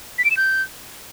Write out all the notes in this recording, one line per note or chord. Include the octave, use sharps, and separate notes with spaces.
B6
D7
E7
G6